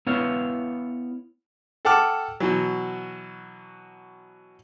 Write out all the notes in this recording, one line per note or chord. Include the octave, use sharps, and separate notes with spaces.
B3 E4 C#5 F5
A4 F#5 G5 A5 D6 F6
B2 E3 F#3